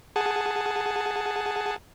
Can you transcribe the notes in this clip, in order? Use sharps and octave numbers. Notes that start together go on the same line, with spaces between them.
G#4 F#5 A5